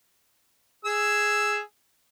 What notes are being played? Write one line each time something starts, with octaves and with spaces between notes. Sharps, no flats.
G#4 E6